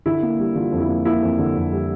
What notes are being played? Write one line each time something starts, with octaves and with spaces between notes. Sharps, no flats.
D3 E4
A#3
G3
D3 F4
F2
E4
A#3
A#3 E4
F2
D3
F2
G3